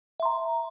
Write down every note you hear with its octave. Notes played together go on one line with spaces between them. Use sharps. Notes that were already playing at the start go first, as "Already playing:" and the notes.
E5 A#5 C6